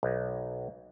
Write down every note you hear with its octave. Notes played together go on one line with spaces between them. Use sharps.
B1